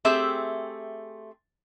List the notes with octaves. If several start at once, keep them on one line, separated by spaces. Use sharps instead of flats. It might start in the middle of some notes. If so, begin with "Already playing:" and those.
A3 C4 G4 G#4 E5